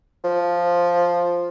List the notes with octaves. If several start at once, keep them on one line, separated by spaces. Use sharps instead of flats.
F3